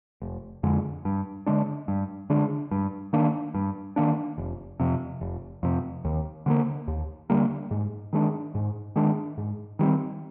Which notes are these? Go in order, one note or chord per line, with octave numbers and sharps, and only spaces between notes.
F1
F2 D3 G#3
G2
D3 G#3 D4
G2
D3 G#3 D4
G2
D#3 A#3 D4
G2
D#3 A#3 D4
F1
F2 C3
F1
F2 C3
D#2
D3 G3 A#3
D#2
D3 G3 A#3
G#2
D#3 G#3 D4
G#2
D#3 G#3 D4
G#2
D#3 G3 C4